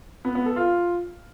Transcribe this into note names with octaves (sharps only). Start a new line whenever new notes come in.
B3
B3
A4
F4